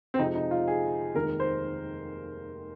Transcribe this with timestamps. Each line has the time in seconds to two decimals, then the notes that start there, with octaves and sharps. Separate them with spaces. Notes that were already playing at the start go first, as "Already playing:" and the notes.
0.14 C4
0.19 F2 C3 F3 G#3 D#4
0.35 D#4
0.51 F4
0.68 G#4
1.14 F1 D#2 D#3 G#3 A#4
1.40 C5